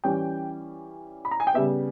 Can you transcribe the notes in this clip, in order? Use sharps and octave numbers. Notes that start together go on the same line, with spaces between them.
E3 G3 C#4 G5
B5
A#5
G#5
G5
C#3 G3 B3 E5